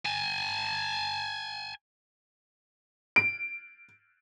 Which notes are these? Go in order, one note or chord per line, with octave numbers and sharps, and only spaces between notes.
G#5 A5
D7